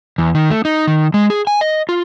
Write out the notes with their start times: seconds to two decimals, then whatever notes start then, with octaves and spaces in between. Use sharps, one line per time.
0.18 E2
0.35 D#3
0.51 A3
0.65 D#4
0.87 D#3
1.14 G#3
1.30 G#4
1.47 G#5
1.61 D#5
1.89 F4